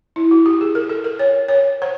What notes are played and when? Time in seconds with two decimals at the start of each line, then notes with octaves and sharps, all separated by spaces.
0.16 E4
0.31 F#4
0.46 G4
0.61 G#4
0.75 A#4
0.89 A4
1.04 A#4
1.19 C#5
1.48 C#5
1.82 C5